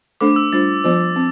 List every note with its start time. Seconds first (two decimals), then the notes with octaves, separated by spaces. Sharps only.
0.21 A3 D4 A4 C5 D6
0.36 E6
0.52 G3 D4 F4 C5 A6
0.84 F3 B3 F4 C5
1.16 C4